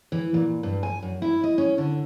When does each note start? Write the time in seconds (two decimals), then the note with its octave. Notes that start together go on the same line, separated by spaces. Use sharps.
0.12 E3
0.34 A#2
0.63 G2
0.83 G#5
1.02 F#2
1.22 E4
1.44 D#5
1.58 C#4
1.78 D3